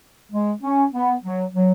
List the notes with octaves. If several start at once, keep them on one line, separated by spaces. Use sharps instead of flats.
G#3
C#4
B3
F#3
F#3